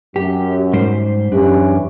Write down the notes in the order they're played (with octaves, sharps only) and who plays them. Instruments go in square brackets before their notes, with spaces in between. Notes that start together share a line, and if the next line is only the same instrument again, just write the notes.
[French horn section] F#2 [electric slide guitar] G4
[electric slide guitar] G#2 G3 C5
[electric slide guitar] F#2 D4 [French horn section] E3 C#4 G4